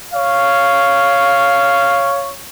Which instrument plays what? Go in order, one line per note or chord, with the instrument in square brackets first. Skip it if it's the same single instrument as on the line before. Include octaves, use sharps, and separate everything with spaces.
[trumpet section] C#5 F5